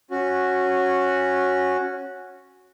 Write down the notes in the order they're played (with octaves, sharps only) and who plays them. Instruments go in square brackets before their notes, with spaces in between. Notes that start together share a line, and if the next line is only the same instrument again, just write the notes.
[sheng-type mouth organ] C#4 F#4